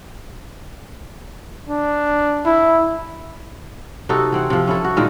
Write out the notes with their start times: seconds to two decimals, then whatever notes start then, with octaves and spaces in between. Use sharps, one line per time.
1.69 D4
2.46 E4
4.09 C3 D#4 F#4 A4
4.32 E3 C4 F#5
4.50 C3 F3
4.67 C#4 E4 A4
4.84 F#4
4.96 A#2 D#3 G#3 A#3